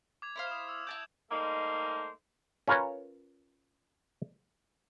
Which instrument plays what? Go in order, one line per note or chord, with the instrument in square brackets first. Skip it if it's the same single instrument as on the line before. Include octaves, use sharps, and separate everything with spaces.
[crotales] D6 G#6 F7
[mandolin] E4 C5 F5
[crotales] D#6 E7
E6
[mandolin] E4 A5 D6 [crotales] G6
[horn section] G3 A3 A#3 D#4 C5 D#5
[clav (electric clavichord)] C#4 F4 A#4 B4 C#5